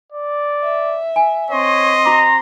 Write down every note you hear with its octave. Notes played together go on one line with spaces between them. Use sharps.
D5
E5
G#5
C4 C#5 D#5 C6
F#4 A#5 D6